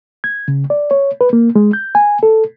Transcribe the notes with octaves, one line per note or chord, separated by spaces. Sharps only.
G#6
C#3
D5
C#5
B4
A#3
G#3
G6
G#5
A4